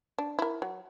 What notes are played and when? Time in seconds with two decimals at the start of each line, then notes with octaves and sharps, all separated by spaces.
0.18 D4
0.39 E4 A#4
0.62 F#3